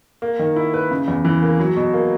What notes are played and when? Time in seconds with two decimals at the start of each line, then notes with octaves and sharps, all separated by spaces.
0.22 A#3
0.39 D#3
0.56 E4
0.74 B4
0.91 C#3
1.08 E2
1.25 E3
1.42 A#3
1.59 F#3
1.76 B2
1.93 A#3